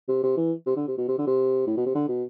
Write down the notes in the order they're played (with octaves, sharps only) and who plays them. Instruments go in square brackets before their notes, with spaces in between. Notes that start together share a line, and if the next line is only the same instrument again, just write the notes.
[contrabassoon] C3
C3
E3
C3
D3
C3
B2
C3
D3
C3
A2
B2
C3
D3
B2